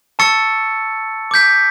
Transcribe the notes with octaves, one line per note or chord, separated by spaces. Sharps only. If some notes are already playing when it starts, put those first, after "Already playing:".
A5 C#6 E6 A6 C#7
D6 G6 B6